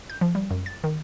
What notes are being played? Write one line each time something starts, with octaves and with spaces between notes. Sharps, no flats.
G6
F3
G3
F#2
A6
D#3